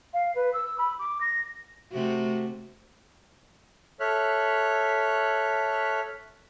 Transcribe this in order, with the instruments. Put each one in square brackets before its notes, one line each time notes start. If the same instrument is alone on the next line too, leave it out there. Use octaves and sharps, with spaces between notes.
[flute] F5
B4
E6
B5
D6
A#6
[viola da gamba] C3 A3 F#4
[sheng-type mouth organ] A4 C#5 E5 F6 F#6